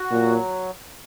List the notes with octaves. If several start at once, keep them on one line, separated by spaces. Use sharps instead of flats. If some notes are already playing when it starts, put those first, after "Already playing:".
Already playing: F#4
A#2 F#3